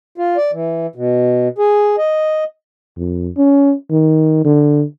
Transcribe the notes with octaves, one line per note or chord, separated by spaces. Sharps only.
F4
D5
E3
B2
G#4
D#5
F2
C#4
D#3
D3